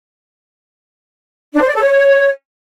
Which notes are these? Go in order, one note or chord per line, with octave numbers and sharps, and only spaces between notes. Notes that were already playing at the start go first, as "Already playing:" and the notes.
D4
C5
D5
A4
C#5